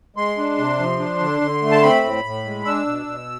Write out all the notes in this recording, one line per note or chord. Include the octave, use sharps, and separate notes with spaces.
G#3 C6
D4
C3
F3
D4
D3
D3
A3
A5
C4 B5
A2
A2
G#3
D4 E6
B2
B2